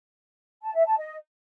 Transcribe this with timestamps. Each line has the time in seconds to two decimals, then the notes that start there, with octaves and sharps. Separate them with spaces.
0.63 A5
0.75 E5
0.86 A5
0.98 D#5